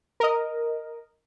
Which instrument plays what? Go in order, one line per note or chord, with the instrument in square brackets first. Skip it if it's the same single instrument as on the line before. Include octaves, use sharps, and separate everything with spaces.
[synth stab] A#4 D#5